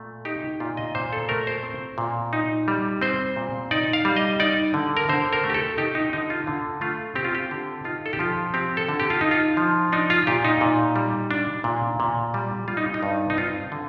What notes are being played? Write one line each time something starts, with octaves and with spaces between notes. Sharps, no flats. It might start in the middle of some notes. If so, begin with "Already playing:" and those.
Already playing: A#2 A3
D#4 G4
A#2 F4
D#5
A#2 C5
A4
A3 A#4
C5
C4
A#2
D#4
G3
C4 C5
A#2
D#4 D5
F5
G3
D#5
D#4 D5
D3
A#4
D3 C5
A#4
A3
G4
A4
D#4 G4
D#4
D3 D#4
F4
D3
A3 F4
C4 G4
F4
G4
D3
D#4 F4
A4
G4
F3 F4
C4 G4
A4
D3
G4
F4
D#4
F4
F3
D4 D#4
F4
A#2 G4
D#4
A#2
G3
D4
A#2
A#2
G3
G3 F4
D#4
D#4
G2
D#4
C4 F4
D3